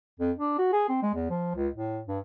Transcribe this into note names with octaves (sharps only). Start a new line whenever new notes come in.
F2
D4
F#4
G#4
C4
G#3
E2
F3
C#2
A2
G2